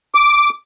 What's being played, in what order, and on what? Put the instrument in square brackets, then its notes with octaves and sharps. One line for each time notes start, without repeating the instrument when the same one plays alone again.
[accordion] D6